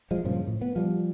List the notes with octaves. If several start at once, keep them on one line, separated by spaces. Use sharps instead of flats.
F3 G#3
G2 A#2 C#3 F3
A2
B3
F3 G3